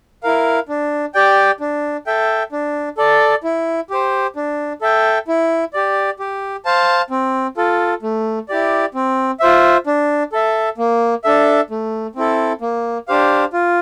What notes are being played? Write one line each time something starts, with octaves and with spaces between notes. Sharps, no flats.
E4 A#4 F5
D4
G4 D5 G5
D4
A4 E5 G5
D4
A4 D5
E4
G4 C5
D4
A4 E5 G5
E4
G4 D5
G4
C5 F5 A5
C4
F4 A4
A3
E4 G4 D5
C4
F4 C5 E5
D4
A4 E5
A#3
D4 A4 E5
A3
C4 E4 A4
A#3
D4 G4 C5 F5
F4